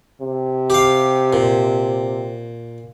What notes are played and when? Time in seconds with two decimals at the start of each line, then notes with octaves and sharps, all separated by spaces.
0.21 C3
0.70 G4 F5
1.33 A#2